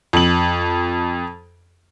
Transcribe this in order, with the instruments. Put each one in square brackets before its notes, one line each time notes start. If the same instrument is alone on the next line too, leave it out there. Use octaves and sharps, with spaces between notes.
[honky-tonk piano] F2 F#7